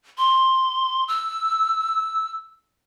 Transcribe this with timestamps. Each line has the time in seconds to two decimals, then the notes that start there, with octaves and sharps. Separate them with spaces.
0.18 C6
1.08 E6